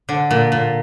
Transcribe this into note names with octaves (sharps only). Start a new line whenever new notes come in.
D3
A#2
A#2